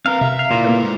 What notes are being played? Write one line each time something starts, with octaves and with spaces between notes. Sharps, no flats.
C4 A#4 B4 F5
C3 E5
F5
A#2 C#3 E4
A#3 A4 B4
G#2